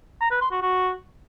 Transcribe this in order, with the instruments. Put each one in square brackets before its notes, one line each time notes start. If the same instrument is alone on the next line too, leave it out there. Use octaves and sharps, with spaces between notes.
[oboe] A#5
B4
C6
F#4
F#4